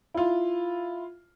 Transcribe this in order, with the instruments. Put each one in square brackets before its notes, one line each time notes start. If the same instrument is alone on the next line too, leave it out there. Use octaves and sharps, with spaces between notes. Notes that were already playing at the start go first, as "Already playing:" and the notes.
[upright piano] E4 F4